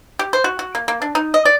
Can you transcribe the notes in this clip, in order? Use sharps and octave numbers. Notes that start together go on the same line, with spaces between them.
G4
C5
F#4
F#4
A#3
A#3
D4
D#4
D#5
D5